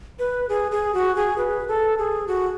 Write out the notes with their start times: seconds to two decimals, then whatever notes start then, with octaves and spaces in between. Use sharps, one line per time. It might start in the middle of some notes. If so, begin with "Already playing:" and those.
0.19 B4
0.49 G#4
0.72 G#4
0.94 F#4
1.16 G#4
1.38 B4
1.68 A4
1.98 G#4
2.28 F#4